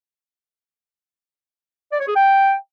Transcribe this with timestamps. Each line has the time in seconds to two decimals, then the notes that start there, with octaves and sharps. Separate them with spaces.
1.93 D5
2.00 C#5
2.08 G#4
2.16 G5